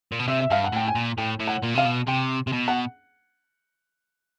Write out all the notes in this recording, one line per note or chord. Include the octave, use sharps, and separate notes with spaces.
A#2
B2
C3 E5
E5
G2 F5
F#5
A2 G5
G#5
A#2
A2 G5
A2
F#5
A#2
C3 F5
B2
C3 G5
C3
B2
F#5